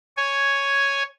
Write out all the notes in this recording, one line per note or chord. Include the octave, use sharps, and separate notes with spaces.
C#5 G#5